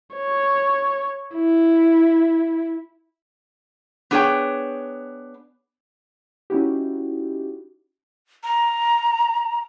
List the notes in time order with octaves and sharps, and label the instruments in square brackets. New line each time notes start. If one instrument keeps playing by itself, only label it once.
[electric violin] C#5
E4
[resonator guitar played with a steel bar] B3 D4 G#4 C5 C#5 G5
[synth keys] C#4 D#4 E4 F#4 G4
[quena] A#5